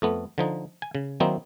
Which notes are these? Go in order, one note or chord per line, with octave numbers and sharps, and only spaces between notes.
F2 A3 B3
D3 F3 D#4
G#5
C#3
D#3 F#3 A#3 C4 D#4 E4